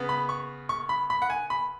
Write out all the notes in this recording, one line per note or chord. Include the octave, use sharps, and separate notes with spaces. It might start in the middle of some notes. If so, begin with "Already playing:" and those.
Already playing: C#3 B3
B5
C#6
C#6
B5
B5
F#5
G#5
B5